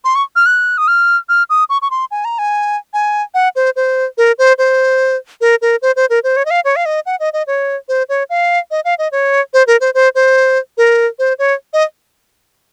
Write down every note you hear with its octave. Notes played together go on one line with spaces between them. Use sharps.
C6
C#6
F6
F#6
D#6
F6
F6
D#6
C#6
C#6
C6
G#5
A#5
G#5
G#5
F#5
C5
C5
A#4
C5
C5
A#4
A#4
C5
C5
A#4
C5
C#5
D#5
F5
C#5
F5
D#5
F#5
D#5
D#5
C#5
C5
C#5
F5
D#5
F5
D#5
C#5
C5
A#4
C5
C5
C5
A#4
C5
C#5
D#5